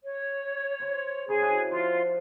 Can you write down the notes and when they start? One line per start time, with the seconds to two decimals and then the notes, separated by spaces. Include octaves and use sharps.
0.04 C#5
0.80 C5 C6
1.28 C#3 G#4 C5 C#5
1.42 D4 E4 F#4
1.71 F3 F4